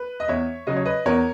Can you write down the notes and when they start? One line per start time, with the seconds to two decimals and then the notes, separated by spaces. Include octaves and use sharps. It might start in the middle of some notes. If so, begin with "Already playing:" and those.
Already playing: B4
0.20 D#5
0.28 E2 C#5 E5
0.67 C#3 F#3 D#5
0.77 C#5
0.86 B4 D#5
1.06 E2 A#4 C#5